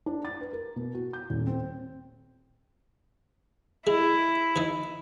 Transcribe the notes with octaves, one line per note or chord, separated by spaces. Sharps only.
D4
A6
B4
A#4
B2
F#4
G6
D#1
C4
G#3 E4
E3 D#4